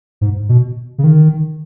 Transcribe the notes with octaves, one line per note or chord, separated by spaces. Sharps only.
G#2
B2
C#3
D#3